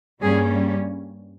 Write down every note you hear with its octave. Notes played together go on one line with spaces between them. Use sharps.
G2 G3 A#3 C#4 G#4